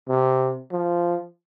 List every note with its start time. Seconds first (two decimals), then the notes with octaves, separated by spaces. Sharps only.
0.08 C3
0.72 F3